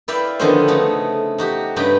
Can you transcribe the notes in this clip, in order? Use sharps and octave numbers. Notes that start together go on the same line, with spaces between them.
E4 B4 D5 E5 F5 G5
D3 D#3 F3 B3 C#4 C5
C#3 A3 D#4
D#4 F#4 G4
G2 C#3 D#4 G4 B4 G5